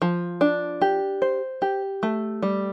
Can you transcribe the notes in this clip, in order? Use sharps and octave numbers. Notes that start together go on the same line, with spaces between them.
F3
D4
G4
C5
G4
A3
G3